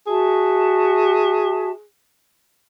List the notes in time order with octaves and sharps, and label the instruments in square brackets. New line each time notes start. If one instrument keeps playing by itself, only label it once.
[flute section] F#4 E5 A5 [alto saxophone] G#4